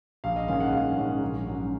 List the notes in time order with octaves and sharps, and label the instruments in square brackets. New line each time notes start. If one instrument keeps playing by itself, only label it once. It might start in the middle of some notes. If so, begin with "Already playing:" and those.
[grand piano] A#1 F5
D#5
G#2 D#3 G#3 C#4 F5
F#5
A#1 F5
G#2 D#3 G#3 C#4
A#1
G#2 F#3 C#4